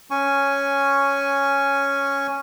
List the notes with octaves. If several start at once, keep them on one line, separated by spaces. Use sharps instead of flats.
C#4 G#5 C#6